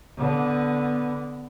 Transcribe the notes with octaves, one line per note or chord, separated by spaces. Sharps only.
D3 B3